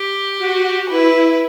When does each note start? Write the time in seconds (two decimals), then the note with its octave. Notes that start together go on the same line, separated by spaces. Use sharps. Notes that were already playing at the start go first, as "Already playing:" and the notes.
Already playing: G4
0.38 F#4
0.89 E4 B4